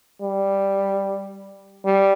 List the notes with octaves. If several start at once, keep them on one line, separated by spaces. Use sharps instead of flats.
G3
G3